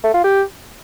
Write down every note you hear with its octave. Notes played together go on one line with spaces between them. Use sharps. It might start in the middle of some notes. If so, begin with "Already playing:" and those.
A3
F4
G4